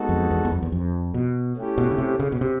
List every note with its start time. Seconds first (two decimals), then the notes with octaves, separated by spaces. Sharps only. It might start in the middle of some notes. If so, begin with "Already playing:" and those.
Already playing: G#3 B3 D#4 F#4 A4
0.09 F2
0.31 E2
0.45 E2
0.52 F2
0.63 E2
0.72 F2
1.14 B2
1.56 A3 C#4 E4 G4
1.78 B2
1.91 C#3
1.98 C3
2.19 C#3
2.32 B2
2.41 C3